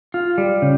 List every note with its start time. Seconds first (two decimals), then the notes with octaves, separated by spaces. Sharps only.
0.14 F4
0.38 G3
0.62 C#3